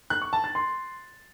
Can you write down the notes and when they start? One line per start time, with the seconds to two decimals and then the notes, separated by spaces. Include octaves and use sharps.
0.10 F#6
0.22 C#6
0.33 A5
0.44 A6
0.55 C6